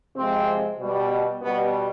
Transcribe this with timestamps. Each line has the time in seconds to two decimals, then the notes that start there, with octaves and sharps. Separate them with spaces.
0.16 C3 F3 G#3 C4
0.79 B2 G3
1.42 B2 G3 B3